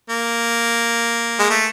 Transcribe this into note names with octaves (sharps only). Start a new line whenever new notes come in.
A#3
G#3
A3